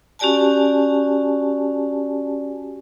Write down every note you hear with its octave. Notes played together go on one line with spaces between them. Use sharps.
C#4 F#4 G4 D5 G#5 A5